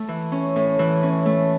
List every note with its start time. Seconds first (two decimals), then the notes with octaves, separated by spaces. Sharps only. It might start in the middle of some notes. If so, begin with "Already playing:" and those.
Already playing: A3
0.08 E3
0.32 C#4
0.56 A2
0.79 E3
1.03 C#4
1.26 A3